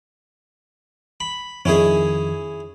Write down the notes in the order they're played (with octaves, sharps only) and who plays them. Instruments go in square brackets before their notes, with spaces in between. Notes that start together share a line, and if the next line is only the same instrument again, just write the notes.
[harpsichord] B5
[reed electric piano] F2 D#3 [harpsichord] C#4 E4 G#4